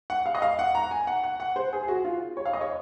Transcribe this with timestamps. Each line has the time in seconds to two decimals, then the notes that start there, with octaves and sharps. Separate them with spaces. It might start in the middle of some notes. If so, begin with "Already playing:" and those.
0.10 F#5
0.26 F5
0.35 D#5
0.42 F5
0.59 F#5
0.75 A#5
0.91 G#5
1.07 F#5
1.24 F#5
1.40 F#5
1.56 C5
1.73 G#4
1.83 G#4
1.88 F#4
2.05 F4
2.37 C#5
2.46 F5
2.53 D#5
2.61 C#5